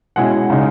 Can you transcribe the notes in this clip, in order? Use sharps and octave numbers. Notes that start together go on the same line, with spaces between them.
B2 G#3 C#4 E4 F#5
C#3 G#3 D#4